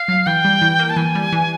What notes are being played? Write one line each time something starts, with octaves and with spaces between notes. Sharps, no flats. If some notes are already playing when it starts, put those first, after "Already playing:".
Already playing: F5
F#3
E3 G5
G3
E3
A#3
A5
E3 G#5
G3
E3